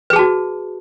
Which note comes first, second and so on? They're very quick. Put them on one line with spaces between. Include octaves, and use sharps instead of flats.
B4 G#4 A5 F#4